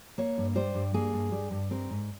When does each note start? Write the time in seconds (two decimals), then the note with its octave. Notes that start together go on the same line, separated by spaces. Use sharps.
0.18 A#3 C#5
0.38 G2
0.56 G3 C5
0.75 G2
0.94 A#3 G#4
1.14 G2
1.32 G3
1.51 G2
1.71 C4 A#4
1.90 G#2